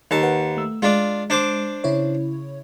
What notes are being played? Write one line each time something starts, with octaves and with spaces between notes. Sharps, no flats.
D#2 A5
B4 F#5
A3 E6
G#3 D4 F4
D4 C5 D6
C#3 E4 C#5